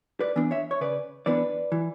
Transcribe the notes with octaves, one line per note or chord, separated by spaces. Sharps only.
B4 D5
E3 B3 D4
C#5 E5
C#5
C#3 B4 D5
E3 B3 D4 B4 D5
E3